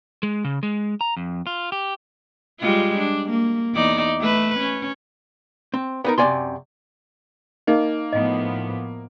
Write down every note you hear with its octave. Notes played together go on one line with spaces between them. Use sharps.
G#3
C#3
G#3
A#5
F2
F4
G4
G3 G#3 F4
D4
A#3
E2 D#4 D5
A3 B4
C#4
C4
B3 D#4 A#4
F#2 C3 E4 D5 G#5 C6
A#3 D#4 D#5
A2 F3 B3 D#5